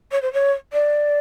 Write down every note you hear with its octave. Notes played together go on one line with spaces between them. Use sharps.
C#5
C5
C#5
D5